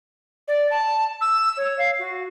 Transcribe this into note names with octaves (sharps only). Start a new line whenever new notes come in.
D5
A5
E6
C#5
F5
F#4